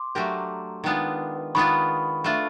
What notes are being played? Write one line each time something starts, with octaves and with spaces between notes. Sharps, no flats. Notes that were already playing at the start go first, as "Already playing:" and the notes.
Already playing: C6 D6
F#3 A3 D4 G4 A#4
D#3 G#3 B3 D4 F4
D#3 G#3 B3 D4 F4 B5 C#6
A3 D4 F4